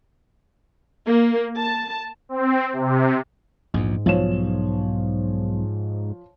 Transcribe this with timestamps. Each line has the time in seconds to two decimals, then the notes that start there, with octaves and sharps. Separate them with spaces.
1.06 A#3
1.56 A5
2.29 C4
2.73 C3
3.74 A#1 E2 G#2
4.06 B1 F3 C#5 E7